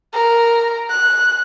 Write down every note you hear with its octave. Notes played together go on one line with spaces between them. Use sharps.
A#4
F#6